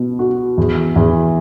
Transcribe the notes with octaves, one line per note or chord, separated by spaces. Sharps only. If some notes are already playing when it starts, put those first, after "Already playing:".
Already playing: B2
F#4
E2
E2